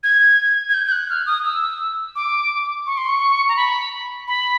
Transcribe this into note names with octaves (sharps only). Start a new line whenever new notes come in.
G#6
G#6
G6
G6
F#6
F6
D#6
E6
D6
C#6
C6
C#6
A#5
B5
B5